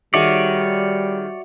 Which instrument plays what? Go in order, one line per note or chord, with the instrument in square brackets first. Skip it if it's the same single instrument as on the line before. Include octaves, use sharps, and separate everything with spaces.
[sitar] D#3 G#4 [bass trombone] G3 [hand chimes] F#4 E5 F#5 [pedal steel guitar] C#5 D5